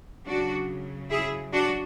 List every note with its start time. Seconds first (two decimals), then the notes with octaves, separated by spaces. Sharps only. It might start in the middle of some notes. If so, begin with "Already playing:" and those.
0.25 C#3 F#3 D4 F#4
1.10 E4 G#4
1.52 D4 F#4